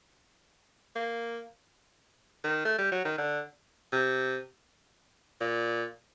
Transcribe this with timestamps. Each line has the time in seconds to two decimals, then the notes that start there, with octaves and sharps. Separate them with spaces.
0.96 A#3
2.44 D#3
2.65 A3
2.78 G3
2.92 F#3
3.05 D#3
3.18 D3
3.93 C3
5.40 A#2